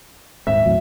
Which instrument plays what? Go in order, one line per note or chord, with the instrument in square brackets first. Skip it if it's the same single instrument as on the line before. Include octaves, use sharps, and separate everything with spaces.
[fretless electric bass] D#1 G#2 C4 [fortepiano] E5
[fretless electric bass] D#2 A2 F#3